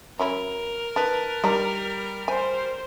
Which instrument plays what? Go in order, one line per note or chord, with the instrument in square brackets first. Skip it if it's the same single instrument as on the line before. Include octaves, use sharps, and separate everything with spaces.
[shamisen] F#3 C#4 E4 [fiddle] A#4
[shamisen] D#3 [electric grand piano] B4 A5
[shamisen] D#3 D4 A#5 [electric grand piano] G3
[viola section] C5 [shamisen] G#5